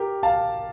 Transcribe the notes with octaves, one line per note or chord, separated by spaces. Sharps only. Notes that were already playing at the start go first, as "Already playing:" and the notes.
Already playing: G4 A#4
F5 A5